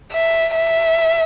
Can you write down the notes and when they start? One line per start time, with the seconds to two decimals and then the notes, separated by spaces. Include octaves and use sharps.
0.13 E5
0.56 E5